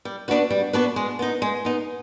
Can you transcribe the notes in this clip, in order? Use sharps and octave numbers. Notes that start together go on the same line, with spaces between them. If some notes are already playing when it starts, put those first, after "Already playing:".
G3
B3 D4 F#4 B4
G3
B3 D4 F#4 B4
G#3
B3 D#4
G#3
B3 D#4